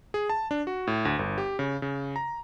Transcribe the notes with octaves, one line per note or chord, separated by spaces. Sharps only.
G#4
A5
D4
F#4
A2
D2
G1
G4
C#3
C#3
A#5